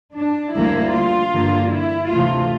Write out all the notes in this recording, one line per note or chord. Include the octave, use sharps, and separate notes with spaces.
D4
D2 D3 G3 A#3 E4
F4
G2 D3 G3 A#3
E4
D2 C3 E3 A3 F4